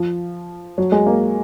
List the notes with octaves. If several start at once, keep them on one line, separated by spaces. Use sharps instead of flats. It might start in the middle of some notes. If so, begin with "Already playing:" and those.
Already playing: F3
F#3
G#3
A#3